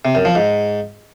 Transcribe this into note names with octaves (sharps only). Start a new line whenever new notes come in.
C3
F#2
F3
G#2